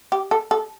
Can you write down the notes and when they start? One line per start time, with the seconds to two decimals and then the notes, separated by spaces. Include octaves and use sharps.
0.12 G4
0.31 A4
0.51 A4